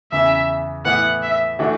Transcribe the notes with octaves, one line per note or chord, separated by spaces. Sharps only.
E2 C#3 E3 E5
A2 E3 B3 F#5
E5
E3 A3 D4 F#4